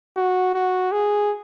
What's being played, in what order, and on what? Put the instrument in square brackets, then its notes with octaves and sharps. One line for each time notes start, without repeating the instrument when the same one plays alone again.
[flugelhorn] F#4
F#4
G#4